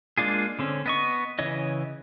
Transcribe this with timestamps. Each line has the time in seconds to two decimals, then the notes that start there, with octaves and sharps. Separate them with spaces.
0.18 G#3 A#3 D4 F4 G#4
0.59 D3 C4 C#4
0.86 B3 D#5 C#6
1.39 C#3 E3 C#5 D#5